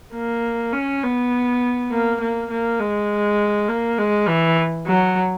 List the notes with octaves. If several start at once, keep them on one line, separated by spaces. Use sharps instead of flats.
A#3
C#4
B3
A#3
A#3
A#3
G#3
A#3
G#3
E3
F#3